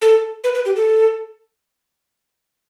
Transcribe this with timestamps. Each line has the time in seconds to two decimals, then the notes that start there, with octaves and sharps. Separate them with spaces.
0.02 A4
0.44 B4
0.55 B4
0.65 G4
0.76 A4